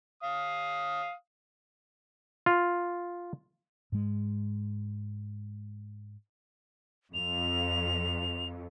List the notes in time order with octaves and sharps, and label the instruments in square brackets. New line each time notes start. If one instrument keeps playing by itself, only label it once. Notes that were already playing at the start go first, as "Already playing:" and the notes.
[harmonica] F5 D#6
[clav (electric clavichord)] F4
[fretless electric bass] G#2 G#3
[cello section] F2 [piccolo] F7